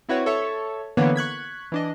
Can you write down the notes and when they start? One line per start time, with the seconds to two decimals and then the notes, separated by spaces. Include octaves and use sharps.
0.09 C4 E4 F#4 B4 C#5
0.26 A4 C#5 E5 C#6
0.97 D3 E3 A#3 B3 C#5
1.16 C#6 F#6 G#6 B6
1.72 E3 D4 D#5